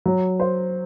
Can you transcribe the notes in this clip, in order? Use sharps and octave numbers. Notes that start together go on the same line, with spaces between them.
F#3
C5